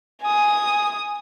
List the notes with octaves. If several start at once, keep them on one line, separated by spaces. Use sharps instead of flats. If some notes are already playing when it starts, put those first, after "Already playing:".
G#5 D#6